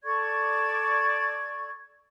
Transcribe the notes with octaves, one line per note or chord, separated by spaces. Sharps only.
A4 D5 C#6 G#6